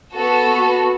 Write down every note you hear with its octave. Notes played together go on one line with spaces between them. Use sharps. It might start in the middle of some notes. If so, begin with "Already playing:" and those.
B3 F#4 A4